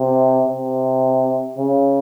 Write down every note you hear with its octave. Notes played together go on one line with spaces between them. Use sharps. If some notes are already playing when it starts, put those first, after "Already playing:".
Already playing: C3
C3
C#3